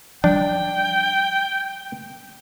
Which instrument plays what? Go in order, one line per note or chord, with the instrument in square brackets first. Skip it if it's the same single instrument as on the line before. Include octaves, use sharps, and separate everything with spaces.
[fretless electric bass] F3 G3 [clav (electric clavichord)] D4 [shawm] G5